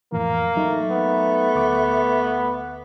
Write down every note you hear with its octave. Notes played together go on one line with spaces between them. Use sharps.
F2 A2 E3 A#3
F#3 A3 D#4
B3
D2 D6